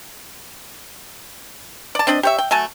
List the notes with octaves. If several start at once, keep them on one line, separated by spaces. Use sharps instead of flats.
D5 A5
C4 D4 D5 D#5
G4 C#5 E5
G5
F#3 A3 G#5 A5